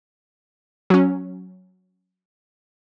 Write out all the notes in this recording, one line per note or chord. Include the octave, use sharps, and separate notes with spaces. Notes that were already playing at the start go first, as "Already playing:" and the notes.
F#3 C#4